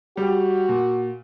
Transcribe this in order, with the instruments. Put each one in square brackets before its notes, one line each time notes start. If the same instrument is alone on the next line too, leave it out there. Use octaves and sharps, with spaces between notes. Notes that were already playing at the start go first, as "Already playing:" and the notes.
[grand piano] G3 G4 [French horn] F#4
[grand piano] A#2